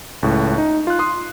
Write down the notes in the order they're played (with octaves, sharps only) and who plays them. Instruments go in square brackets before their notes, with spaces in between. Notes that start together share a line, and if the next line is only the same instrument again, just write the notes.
[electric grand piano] C#2 A2
D#4
F4 F#6
C6 D#6